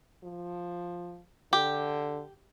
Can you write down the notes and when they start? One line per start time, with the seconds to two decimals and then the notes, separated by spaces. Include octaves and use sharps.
0.24 F3
1.53 D3 G4